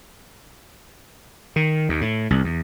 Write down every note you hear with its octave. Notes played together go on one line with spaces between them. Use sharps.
D#3
D#2
A2
C2
E2